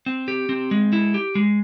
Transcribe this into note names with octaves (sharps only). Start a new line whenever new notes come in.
C4
G4
C4
G#3
E4
G4
G#3